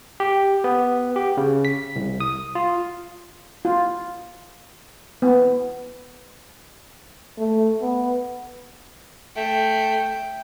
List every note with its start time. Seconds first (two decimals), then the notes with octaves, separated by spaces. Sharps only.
0.20 G4
0.64 B3
1.16 G4
1.37 C#3
1.65 B6
1.96 C2
2.20 D#6
2.55 F4
3.65 F4
5.22 B3
7.38 A3
7.82 B3
9.36 A3 G5